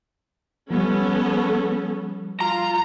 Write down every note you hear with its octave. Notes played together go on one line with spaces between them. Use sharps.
F3 G3 B3 C#4 A4
F4 A#5